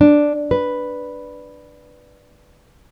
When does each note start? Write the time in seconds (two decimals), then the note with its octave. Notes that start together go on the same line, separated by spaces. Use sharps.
0.01 D4
0.51 B4